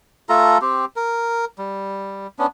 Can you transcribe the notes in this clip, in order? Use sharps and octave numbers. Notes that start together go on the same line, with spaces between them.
A3 F4 A4 A#5
C4 G4
A#4
G3
B3 C#4 D4